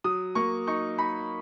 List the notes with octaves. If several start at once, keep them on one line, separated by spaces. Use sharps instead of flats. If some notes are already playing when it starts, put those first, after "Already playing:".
F#3 D#6
A#3 C#6
D#4 C#6
D#4 B5